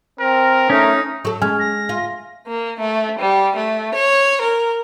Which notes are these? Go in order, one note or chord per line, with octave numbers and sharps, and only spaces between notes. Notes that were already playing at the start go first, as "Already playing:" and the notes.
C4 A#4
A3 C#4 D#4
F#3 A4
G#3 C#4 G#5 F6
A#6
F4
A#3
A3
G3
A3
C#5
A#4